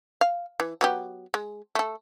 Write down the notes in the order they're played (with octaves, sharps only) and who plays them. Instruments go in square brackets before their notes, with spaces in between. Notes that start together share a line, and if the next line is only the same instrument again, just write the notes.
[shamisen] F5
E3
F#3 B3 G4
G#3
A3 A4